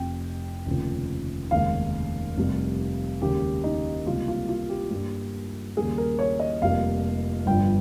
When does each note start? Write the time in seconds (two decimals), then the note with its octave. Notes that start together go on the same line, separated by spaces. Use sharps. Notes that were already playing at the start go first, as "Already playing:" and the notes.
Already playing: F1 F2 C3 G5
0.66 F1 D#2 C#3 F3
1.51 F1 D#2 C#3 G#3 F5
2.37 F1 F2 C3 G3
3.22 D#2 C#3 G#3 G4
3.64 D#4
4.06 C#2 C3 G3 A#3 F4
4.28 F4
4.49 F4
4.70 G4
4.91 G2 G3 A#3
5.77 D#2 C#3 G3 A#3 G#4
5.98 A#4
6.19 C#5
6.40 D#5
6.62 F1 F2 C3 G3 A#3 F5
7.46 G1 G2 F3 G5